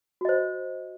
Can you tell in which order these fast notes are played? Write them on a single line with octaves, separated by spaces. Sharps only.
F#4 D#5 C5